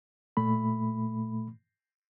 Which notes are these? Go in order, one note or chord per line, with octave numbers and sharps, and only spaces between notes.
A#2 A3 B5